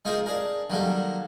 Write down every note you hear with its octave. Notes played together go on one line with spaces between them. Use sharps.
G#3 D#4 F4 G#4 A#4 C5
D4 G#4 A#4
D#3 F#3 G3 A#3 A4